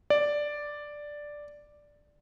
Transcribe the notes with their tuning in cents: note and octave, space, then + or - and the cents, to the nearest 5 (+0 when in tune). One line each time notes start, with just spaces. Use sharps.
D5 +0